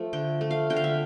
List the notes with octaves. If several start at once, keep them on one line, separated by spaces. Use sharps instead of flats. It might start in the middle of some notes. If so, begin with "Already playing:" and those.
Already playing: F3 A3
D3 G5
A3
F5
D3 G5
F5
E5